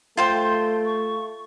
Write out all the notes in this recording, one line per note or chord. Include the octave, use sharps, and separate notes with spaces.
A3 F4 C5 G5 C6
C#6